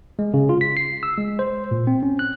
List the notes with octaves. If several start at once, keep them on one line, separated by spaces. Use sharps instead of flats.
G#3
C#3
F4
B6
C7
E6
G#3
C5
A#2
C4
C#4
F#6